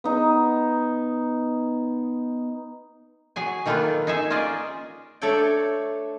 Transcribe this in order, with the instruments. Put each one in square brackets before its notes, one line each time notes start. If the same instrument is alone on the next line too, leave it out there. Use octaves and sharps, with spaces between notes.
[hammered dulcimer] B3 D#4
[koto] F#3 G#4 G#5
D#3 A3 A#3 D#4 F4 B4
D#4 G#4 E5
C#4 F4 G#4 D5 D#5
[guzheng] A3 D4 A4 C#5 G5